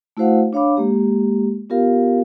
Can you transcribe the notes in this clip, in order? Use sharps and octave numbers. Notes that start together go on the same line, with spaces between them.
A3 E4 F#4 C5 F5 F#5
D4 C#5 F5 B5 D6
G#3 A#3 G4
B3 F4 G4 A#4 F5